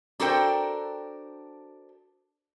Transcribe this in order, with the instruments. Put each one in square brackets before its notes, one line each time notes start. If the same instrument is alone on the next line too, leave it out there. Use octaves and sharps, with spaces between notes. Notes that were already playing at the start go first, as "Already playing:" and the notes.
[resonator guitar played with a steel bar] D4 F#4 A4 A#4 C5 G5